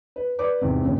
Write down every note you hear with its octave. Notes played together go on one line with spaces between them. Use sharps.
B4
B4 D5 D6
E2 G#2 C3
C#2 G2 A#2 C#3